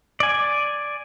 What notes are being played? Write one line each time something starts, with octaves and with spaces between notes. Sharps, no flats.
D5 G#5